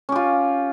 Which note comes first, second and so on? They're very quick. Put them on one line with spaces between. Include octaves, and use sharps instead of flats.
C#4 G4 F4